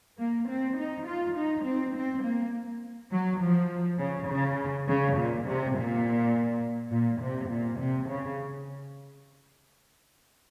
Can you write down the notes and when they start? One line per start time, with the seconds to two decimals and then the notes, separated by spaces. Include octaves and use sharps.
0.20 A#3
0.49 C4
0.78 D#4
1.07 F4
1.37 D#4
1.65 C4
1.95 C4
2.24 A#3
3.12 F#3
3.41 F3
3.99 C#3
4.28 C#3
4.87 C#3
5.16 A#2
5.46 C3
5.75 A#2
6.92 A#2
7.21 C3
7.50 A#2
7.80 C3
8.09 C#3